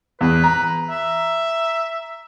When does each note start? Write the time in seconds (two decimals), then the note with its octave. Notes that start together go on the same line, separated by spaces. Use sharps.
0.21 E2 B4
0.44 A#5
0.90 E5